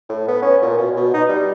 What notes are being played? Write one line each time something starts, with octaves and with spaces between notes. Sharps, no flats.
A2
B3
C#4
A#2
B2
B2
D#4
G3